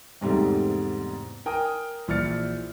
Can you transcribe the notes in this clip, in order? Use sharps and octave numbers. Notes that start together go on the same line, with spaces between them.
E2 G#2 C3 G3 A3
A#4 G5 G#5 D#6
A#1 E3 D5 F6 A6 C#7